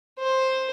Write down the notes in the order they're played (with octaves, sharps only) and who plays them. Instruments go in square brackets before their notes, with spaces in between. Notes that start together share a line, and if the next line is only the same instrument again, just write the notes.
[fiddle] C5